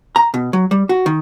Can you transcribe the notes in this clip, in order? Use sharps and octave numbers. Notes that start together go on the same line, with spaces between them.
A#5
B2
F#3
G3
F#4
D#3